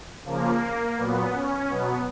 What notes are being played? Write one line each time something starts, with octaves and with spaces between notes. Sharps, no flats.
C#3 F3 A#3
A#2 F#3 B3
C#4
B2 F#3 B3